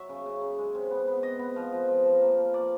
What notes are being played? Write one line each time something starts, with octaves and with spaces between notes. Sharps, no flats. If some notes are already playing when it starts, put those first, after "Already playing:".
Already playing: F#3 E5
C#3
C#3
C#3
G#3
C3
B3
B3
C3 D#5
B3
F3
F3
F3
F3
A#3
F3
A#3 D5